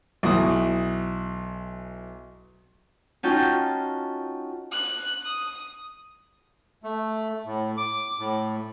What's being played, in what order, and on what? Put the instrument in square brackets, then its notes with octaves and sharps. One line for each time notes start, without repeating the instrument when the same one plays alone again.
[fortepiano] B1 E3 D#6
[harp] C#4 D#4 F4 F#4 G5 A5
[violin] F#6
D#6
[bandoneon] A3
A2
D6
A2